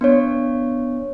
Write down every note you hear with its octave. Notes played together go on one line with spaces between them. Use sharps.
B3 D4 C#5